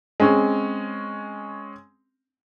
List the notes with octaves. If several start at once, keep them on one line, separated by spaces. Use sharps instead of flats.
G#3 C4 C#4